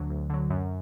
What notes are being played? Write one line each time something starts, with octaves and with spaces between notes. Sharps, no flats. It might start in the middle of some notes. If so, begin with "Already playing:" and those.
Already playing: D2 D3 F#3
D2
D3 F#3
F#2